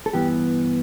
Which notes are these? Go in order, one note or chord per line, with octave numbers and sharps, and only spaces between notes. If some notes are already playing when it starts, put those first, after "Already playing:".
A4
G2 E3 B3 G4